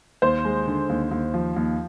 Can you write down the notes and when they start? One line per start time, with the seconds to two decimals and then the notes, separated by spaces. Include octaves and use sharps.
0.22 D#2 C5
0.45 G#3
0.67 D3
0.89 D#2
1.11 D#2
1.34 F3
1.56 D#2